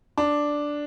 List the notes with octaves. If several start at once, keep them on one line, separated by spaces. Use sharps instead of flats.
D4